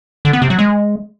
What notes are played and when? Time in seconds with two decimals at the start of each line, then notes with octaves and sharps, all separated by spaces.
0.25 D3
0.33 B3
0.42 C3
0.50 F#3
0.59 G#3